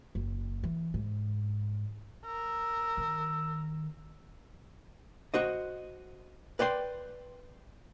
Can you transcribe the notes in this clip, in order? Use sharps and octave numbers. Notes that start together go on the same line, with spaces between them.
F#1
E3
G#2
A#4 E6
D#3
F#4 C5 D#5
B4 D5 G5 C6